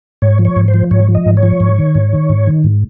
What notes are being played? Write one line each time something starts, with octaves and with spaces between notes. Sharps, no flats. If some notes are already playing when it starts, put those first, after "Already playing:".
G#2 C#5
F3
C#5
G#2
C5
F3
G#2 C#5
F3
D#5
G#2
C#5
F3
G#2
D#3
G#2
D#3
G#2
D#3
G#2